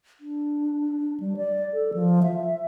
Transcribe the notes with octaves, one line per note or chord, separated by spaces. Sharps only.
D4
G3
D5
A4
F3
E5